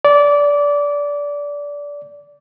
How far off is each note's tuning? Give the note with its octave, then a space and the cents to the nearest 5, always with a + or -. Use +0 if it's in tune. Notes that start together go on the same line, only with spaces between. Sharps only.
D5 -20